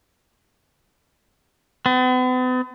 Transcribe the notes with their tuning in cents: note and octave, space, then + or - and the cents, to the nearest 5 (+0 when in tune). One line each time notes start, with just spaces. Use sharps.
B3 +45